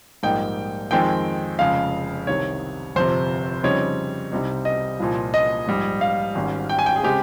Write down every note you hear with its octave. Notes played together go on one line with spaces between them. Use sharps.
A#1 G#2 G3 A#3 D#4 G5
F2 D#3 G#3 C4 G5
F1 F2 C#3 G#3 F5
C2 C3 D#3 C#5
G1 F2 C3 C5
F2 C#3 G3 C4 D#4 C#5
C2 C3 G3 C4 D#4
D#5
C2 A#2 F3
D#5
A#1 G#2 G3
F5
G#1 G#2 G3 C#4
G5
G#5
G5
G#4
C#3 G#3 C4 G4